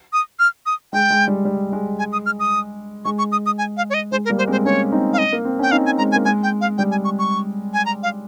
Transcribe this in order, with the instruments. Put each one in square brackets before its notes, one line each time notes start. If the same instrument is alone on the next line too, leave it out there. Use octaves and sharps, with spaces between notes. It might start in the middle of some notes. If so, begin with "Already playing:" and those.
[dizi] D#6
F6
D#6
[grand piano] G#3 [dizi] G5
[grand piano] G#3
G3
G3
G#3
[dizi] G#5
D#6
F6
D#6
[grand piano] G#3 [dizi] C#6
[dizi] C#6
D#6
D#6
G#5
F5
C#5
D#5
[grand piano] G#3 [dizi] C5
[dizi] A#4
[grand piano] G3 A#3
[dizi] C5
[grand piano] G#3 C4
[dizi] C5
[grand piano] A#3 C#4 [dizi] C#5
[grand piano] C4 D#4
[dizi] F5
D#5
[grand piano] A#3
C4
[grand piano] C#4 [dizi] G5
[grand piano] C4 D#4 [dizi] F5
[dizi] G#5
[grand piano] G#3 C4 [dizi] A#5
[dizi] G#5
[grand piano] A#3
[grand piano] G#3 [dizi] G#5
[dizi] G5
F5
[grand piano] G3 [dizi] G5
[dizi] G#5
C#6
C#6
G#5
A#5
F5